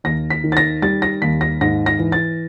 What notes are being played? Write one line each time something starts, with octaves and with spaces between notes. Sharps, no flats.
D#2 A#6
B6
D#3
A6
A#6
G3 A6
A#6
D#2 B6
A#6
G#2 A#6
A#6
E3
A6